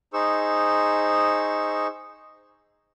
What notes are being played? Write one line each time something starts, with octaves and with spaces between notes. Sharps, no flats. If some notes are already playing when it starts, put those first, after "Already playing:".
D#4 G#4 C5 C#6 E6